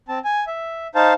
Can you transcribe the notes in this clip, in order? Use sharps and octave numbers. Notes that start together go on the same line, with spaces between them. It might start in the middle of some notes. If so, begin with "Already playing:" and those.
C4 A5
G#5
E5
D#4 C5 F5 A5